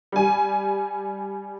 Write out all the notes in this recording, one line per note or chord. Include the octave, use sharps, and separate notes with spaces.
G3 G#5